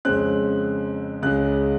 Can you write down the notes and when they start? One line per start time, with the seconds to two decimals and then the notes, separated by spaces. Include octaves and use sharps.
0.05 F2 C#3 G#3 C4 F#6
1.22 C#2 C#3 G#3 F#6